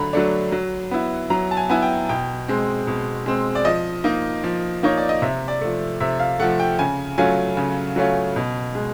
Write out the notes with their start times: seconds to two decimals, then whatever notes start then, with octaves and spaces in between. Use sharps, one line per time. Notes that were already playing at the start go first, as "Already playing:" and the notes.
Already playing: D3 F#3 A3 A#5 B5
0.13 F#3 A3 D4
0.52 F#3
0.91 B3 E4
1.30 F#3 A#5
1.51 A5
1.57 G#5
1.69 B3 E4 G#5
1.82 G5
2.09 B2 G5
2.48 G#3 C4
2.87 B2
3.26 G#3 C4
3.55 D5
3.65 F3 D#5
4.04 A#3 D#4
4.44 F3
4.83 A#3 D#4 C#5
4.97 D5
5.09 D#5
5.22 C3 E5
5.48 D5
5.61 F3 A3
6.00 C3 E5
6.19 F5
6.39 A3 F#5
6.43 F3
6.60 G5
6.79 C#3 G#5
7.18 F#3 A3 C#4 F4 G#5
7.57 C#3
7.96 F#3 A3 C#4 F4
8.36 B2
8.75 G#3